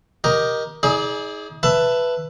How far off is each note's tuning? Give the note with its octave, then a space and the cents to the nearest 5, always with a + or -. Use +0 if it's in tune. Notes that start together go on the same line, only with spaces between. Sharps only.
G4 +0 A#4 +15 D#5 +0
D#4 +45 G#4 +10 D5 +0
B4 +0 E5 +15 A5 +10